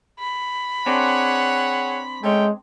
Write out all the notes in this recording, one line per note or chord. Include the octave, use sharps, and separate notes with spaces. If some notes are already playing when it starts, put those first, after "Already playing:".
B5
C4 D4 G#4 C#5 F#5
G#3 A3 C#4 G5